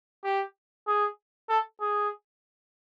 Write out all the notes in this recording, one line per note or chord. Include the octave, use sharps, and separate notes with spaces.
G4
G#4
A4
G#4